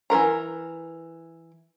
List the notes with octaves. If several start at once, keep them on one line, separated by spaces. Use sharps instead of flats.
E3 F3 A#4 A#5